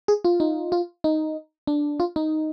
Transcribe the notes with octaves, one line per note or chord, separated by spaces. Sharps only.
G#4
F4
D#4
F4
D#4
D4
F4
D#4